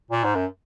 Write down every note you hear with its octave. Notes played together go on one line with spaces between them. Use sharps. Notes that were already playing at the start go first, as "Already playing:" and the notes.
A#2
G#2
F#2